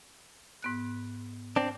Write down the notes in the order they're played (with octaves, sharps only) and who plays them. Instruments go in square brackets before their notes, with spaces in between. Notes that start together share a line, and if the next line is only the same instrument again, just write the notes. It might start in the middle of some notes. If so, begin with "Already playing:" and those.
[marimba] G#2 B3 F#6
[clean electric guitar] C4 D4